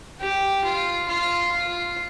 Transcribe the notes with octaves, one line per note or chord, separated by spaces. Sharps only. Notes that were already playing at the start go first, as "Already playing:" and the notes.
G4
F4
F4
F4